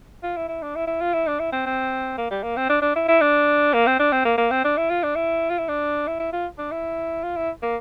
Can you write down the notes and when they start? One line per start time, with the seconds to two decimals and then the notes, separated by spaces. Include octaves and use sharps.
0.23 F4
0.36 E4
0.48 E4
0.62 D4
0.75 E4
0.87 E4
1.01 F4
1.13 E4
1.27 D4
1.39 E4
1.52 C4
1.66 C4
2.17 A#3
2.30 G3
2.43 A#3
2.56 C4
2.69 D4
2.82 D4
2.95 E4
3.08 E4
3.21 D4
3.73 A#3
3.86 C4
3.99 D4
4.12 C4
4.25 A#3
4.37 A#3
4.51 C4
4.64 D4
4.77 E4
4.90 F4
5.03 D4
5.15 E4
5.50 F4
5.58 E4
5.68 D4
6.07 E4
6.19 E4
6.32 F4
6.58 D4
6.71 E4
7.23 F4
7.36 E4
7.62 A#3